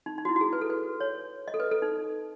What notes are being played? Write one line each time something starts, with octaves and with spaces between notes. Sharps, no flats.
D#4
D#4
F#4
E4
F#4
G#4
B4
A4
B4
C#5
D#5
A4
B4
A4
D#4